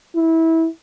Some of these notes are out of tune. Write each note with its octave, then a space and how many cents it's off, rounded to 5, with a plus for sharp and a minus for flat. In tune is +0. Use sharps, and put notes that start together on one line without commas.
E4 -20